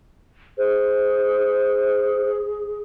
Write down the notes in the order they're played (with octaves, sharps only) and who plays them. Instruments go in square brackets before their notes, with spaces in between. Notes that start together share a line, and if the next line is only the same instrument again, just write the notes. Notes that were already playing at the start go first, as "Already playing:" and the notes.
[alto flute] G#4 [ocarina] C5